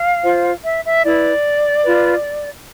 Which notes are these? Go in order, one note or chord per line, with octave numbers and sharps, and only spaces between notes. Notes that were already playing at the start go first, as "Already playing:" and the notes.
Already playing: F5
F4 C5
E5
E5
E4 B4 D5
F4 B4